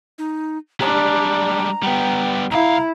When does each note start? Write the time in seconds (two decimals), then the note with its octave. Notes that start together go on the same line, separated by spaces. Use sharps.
0.18 D#4
0.81 G3 G#3 D4 A#5
1.83 G3 B3 G5
2.51 C2 E4 F5 A#5